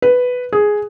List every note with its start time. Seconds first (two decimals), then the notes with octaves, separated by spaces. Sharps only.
0.02 B4
0.53 G#4